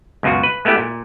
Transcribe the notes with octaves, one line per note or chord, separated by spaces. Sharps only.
C#2 F#2 B2 F4 F#4
B4
G#3 A3 B3 E4 G4
A#2